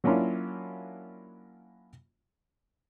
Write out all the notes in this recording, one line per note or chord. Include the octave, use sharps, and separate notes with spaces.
F#3 A#3 C#4 D4 E4 F4